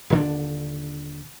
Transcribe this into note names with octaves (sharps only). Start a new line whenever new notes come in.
D#1 D3 D4